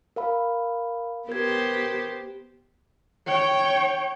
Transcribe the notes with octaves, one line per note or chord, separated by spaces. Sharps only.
A#4 F5 B5
B3 G4 A#4 C5 G#6
C#5 G5